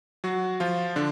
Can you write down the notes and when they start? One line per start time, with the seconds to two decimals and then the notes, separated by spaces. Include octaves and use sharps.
0.24 F#3 F#4
0.60 F3 F4
0.96 D3 D4